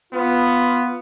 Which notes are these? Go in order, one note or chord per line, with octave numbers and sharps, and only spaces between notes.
B3 F4